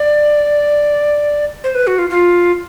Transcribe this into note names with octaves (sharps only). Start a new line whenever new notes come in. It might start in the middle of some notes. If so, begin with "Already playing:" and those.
Already playing: D5
C5
B4
F#4
F4
F4